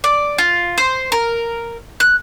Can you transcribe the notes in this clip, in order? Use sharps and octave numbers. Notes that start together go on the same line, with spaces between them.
D5
F4
C5
A#4
F#6